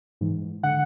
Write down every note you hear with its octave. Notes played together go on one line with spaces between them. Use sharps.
G#2 E3
D3 F#5